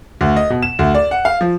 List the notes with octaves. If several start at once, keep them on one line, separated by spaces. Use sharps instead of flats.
D2
D#5
B2
E7
D2
D5
F#5
F5
F3